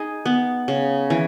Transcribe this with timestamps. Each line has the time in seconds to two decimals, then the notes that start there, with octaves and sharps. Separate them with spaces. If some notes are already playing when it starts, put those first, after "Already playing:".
Already playing: D#4 G#4
0.26 B3
0.68 C#3
1.10 E3